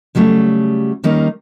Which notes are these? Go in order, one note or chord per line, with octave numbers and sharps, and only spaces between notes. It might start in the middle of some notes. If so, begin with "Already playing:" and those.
C#3 F#3 G3 A3
D#3 G3 A#3 C#4 D#4